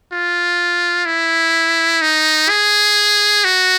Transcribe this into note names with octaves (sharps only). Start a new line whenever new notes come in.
F4
E4
D#4
G#4
F#4